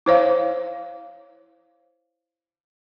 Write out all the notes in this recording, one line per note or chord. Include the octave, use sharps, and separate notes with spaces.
E4 C5 C#5 F5